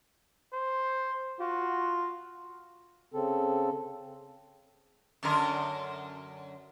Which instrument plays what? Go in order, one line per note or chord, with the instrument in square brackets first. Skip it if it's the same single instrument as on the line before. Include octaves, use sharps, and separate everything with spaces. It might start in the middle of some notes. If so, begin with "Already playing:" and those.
[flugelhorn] C5
[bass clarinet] F4 [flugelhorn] F#4
[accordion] C#3 C4 A4
[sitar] F#2 D3 A#4